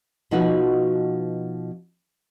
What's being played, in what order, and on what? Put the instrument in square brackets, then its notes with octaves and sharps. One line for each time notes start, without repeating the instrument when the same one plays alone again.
[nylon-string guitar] B2 F3 D#4 F#4 B4